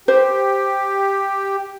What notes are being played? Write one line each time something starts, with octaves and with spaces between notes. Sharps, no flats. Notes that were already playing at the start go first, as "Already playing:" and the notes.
G4 C5